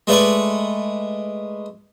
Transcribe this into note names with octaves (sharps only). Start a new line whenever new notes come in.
G#3 A3 B4 D5 C#6 D6